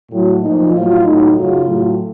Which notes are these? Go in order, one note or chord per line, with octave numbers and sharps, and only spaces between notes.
A2 F#3
A#2 F3 D#4
A2 F#3 F4
A2 F#3 D#4
F#2 C#3 F#3 F4
A2 F#3